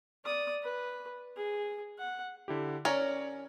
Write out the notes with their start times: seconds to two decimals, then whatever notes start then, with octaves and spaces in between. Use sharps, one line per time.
0.25 D5 D#6
0.63 B4
1.37 G#4
1.99 F#5
2.48 D3 E4 G4
2.85 C#4 A#4 C#5 D5